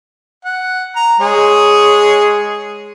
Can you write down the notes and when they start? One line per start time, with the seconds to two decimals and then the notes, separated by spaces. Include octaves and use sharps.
0.45 F#5
0.96 A#5
1.20 G#3 G#4 C#5